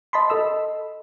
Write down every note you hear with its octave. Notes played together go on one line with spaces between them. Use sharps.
D#5 A5 B5 C6
A4 D#5 E6